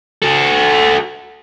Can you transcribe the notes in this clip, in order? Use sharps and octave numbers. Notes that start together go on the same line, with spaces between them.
F#4 A4